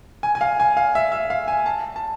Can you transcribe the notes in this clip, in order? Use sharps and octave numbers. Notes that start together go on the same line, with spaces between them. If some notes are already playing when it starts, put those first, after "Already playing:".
G#5
G#5
F5
G#5
F5
E5
E5
F5
G#5
A5
A5